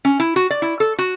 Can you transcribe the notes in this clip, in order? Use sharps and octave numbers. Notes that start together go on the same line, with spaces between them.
C#4
E4
F#4
D5
E4
A4
F#4